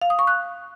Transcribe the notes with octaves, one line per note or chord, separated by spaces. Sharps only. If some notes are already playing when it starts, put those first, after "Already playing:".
F5
D#6
C#6
F#6